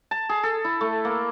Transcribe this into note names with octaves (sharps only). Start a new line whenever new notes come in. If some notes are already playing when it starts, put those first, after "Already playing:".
A5
G#4
A4
E4
A3
A#3